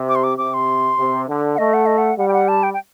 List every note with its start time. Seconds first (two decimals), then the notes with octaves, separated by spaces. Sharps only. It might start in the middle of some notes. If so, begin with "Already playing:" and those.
Already playing: C3
0.09 D6
0.15 C6
0.24 D6
0.38 C3 D6
0.54 C6
0.98 C3
1.28 D3
1.55 F#5
1.58 A3 D#5
1.74 F#5
1.86 D#5
1.98 F#5
2.19 G3 F#5
2.28 G5
2.33 F#5
2.48 A5
2.63 G5
2.74 G5